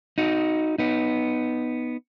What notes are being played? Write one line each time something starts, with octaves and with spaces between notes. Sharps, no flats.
D#4 F#4
B3 D#4